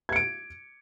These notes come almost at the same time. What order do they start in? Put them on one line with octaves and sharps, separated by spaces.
G#6 C#7 D7